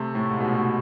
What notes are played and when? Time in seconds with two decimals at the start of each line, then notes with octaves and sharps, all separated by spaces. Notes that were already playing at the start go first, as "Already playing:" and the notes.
Already playing: C3 A3
0.15 A2
0.30 G#2
0.40 B2
0.45 A2
0.55 A2